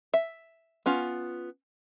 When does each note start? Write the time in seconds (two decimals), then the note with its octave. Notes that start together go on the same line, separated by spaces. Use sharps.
0.14 E5
0.86 B3 C#4 F4